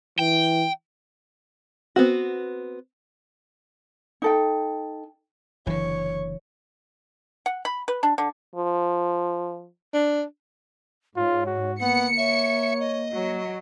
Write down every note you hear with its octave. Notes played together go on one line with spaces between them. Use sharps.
E3 G5
B3 C4 F#4
D#4 A4 G5
F#1 D3 E3 C#5
F#5
B5
B4
D4
D3
F3
D4
G#2 F4 C#5
F#4
A#3 B3 F#5 C#7
C#5 E5
D#5
F#3